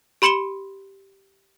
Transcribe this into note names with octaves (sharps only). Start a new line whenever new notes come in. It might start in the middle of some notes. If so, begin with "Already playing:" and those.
G4 B5 C6 C#7 E7 G7